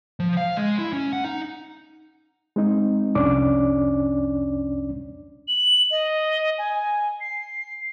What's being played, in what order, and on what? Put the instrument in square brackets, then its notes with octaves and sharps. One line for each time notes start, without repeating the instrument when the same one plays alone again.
[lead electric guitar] F3
F5
G#3
E4
C#4
F#5
D#4
[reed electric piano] G#3 C4 D#4
C2 F2 C#4 D4 D5 D6
[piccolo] F#7
D#5
G#5
C7